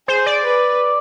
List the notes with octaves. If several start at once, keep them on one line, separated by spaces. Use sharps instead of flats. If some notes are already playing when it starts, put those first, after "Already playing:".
G#4 C5
D5
B4